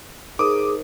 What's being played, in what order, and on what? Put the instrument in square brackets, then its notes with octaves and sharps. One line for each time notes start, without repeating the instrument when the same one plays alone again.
[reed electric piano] D#4 A#4 C5 [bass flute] G#4 [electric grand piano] D6 D#6